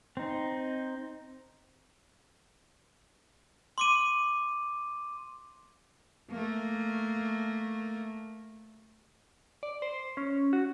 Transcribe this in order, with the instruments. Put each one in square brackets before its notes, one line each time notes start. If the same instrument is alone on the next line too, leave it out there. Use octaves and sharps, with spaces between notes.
[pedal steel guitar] C4 D#4
[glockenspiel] C6 D6 D#7
[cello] A3 A#3
[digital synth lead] D5
C5
C#4
F#4